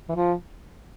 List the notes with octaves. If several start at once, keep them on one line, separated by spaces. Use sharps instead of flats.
E3
F3